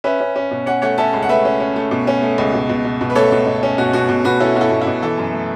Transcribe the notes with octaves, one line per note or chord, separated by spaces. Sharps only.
C#4 B4 E5
C#4
C#4
B2
C#4 C#5 F#5
A3 C#5 F#5
C#4 E5 A5
C#2
F#5
A3 B4 E5
C#4
C#4
A3
B2
C#4
A3
C#2
B2
B2
B2
B2
B4
A3 A4 C#5
B2
B2
C#4
B2 F#4
B2 F#4
B2
B2 F#4 B4
C#4 E4 A4
B2 F#4
E4 A4
B2
E4
B2
E3 E4 A4
F#2
A3